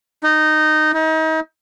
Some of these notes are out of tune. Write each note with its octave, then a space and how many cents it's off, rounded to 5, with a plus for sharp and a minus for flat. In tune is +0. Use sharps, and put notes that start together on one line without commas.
D#4 -10
D#4 +35